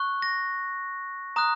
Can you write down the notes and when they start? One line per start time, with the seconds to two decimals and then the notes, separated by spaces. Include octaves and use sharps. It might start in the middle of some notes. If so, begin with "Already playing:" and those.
Already playing: C#6 F#6
0.22 A#6
1.36 A#5 D#6 F#6